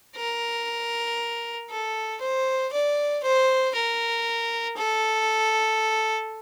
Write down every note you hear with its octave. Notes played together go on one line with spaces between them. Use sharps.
A#4
A4
C5
D5
C5
A#4
A4